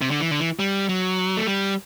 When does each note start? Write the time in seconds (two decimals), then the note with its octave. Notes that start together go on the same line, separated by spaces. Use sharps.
0.01 C3
0.11 D3
0.20 E3
0.31 D3
0.40 E3
0.59 G3
0.89 F#3
1.37 A3
1.47 G3